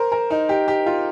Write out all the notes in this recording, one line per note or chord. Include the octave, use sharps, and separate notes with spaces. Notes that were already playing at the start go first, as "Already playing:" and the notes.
Already playing: A#4 C5
A#4
D#4
G4
G4
F4